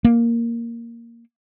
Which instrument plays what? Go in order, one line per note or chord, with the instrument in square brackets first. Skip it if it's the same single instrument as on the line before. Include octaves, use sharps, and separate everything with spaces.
[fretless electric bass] A#3